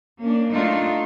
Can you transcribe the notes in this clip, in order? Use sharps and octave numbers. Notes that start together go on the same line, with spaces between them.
A#3 C#4 D4
A3 D4 D#4 F4